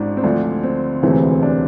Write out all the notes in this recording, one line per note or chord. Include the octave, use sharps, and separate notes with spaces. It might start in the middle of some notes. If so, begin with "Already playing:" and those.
Already playing: G#1 G#2 D4 E4
C4
D2 D3 F3 D4
C4
E1 D2 C3 E3 C4
D4